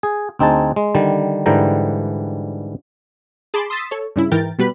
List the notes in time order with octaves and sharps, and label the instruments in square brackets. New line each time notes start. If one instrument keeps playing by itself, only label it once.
[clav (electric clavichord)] G#4
D2 C4 D#4 G#4 A5
G#3
D3 D#3 G3
G#2 D3 E3 G3 G5 A#5
[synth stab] G#4 A5 B5 C6 D6
C6 D#6 E6 A6 B6
A4 C#5
G2 C#3 E4
G#2 E3 A#4 G5 A6
B2 G3 B4 B5